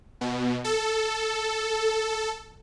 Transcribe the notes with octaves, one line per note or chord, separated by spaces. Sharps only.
B2
A4